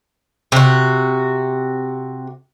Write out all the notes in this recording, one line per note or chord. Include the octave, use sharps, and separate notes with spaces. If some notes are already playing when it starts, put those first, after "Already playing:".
C3 F#4